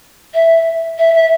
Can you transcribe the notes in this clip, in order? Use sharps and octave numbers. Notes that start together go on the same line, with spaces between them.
E5
E5
E5